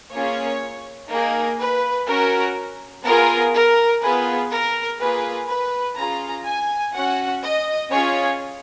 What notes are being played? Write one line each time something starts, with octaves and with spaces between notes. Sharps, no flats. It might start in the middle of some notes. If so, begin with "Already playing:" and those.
A#3 C#4 F4 G#4 C#5
A#3 D#4 G#4 A#4
B4
C#4 F#4 A#4
B3 F4 G#4 A#4
A#4
B3 F4 G#4 B4
A#4
A#3 F4 G#4 B4
B4
C#4 F4 G#4 A#5
G#5
C#4 F#4 F#5
D#5
C#4 F4 G#4 C#5